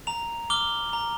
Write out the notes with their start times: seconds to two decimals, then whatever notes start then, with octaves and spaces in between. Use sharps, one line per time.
0.07 A#5 F7
0.50 D6 F6 G7
0.93 A#5